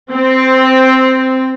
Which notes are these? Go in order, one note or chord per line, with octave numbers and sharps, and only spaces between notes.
C4